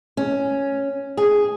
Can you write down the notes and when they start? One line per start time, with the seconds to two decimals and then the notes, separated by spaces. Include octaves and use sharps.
0.17 C#4
1.17 G#4